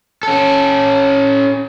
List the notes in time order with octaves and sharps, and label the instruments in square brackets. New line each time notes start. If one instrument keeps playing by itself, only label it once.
[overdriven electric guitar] C#4 A4